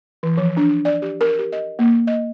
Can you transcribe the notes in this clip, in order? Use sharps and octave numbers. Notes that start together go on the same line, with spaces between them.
E3
F3
D4
D5
G4
A#4
G4
D#5
A#3
D#5